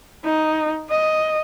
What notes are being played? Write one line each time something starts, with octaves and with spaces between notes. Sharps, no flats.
D#4
D#5